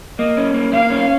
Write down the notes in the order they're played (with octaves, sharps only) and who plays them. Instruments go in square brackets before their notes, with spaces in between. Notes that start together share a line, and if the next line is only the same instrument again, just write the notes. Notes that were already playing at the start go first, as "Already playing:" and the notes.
[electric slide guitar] A#3 [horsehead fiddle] D#5
[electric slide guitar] C#4
A#3
[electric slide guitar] A#3 [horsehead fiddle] F5
[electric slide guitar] C#4